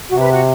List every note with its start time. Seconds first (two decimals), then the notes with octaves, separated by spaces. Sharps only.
0.09 C3 F#4
0.20 B4
0.30 F#4